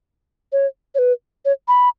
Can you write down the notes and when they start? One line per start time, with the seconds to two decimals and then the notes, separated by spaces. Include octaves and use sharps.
0.52 C#5
0.95 C#5
0.99 B4
1.45 C#5
1.68 B5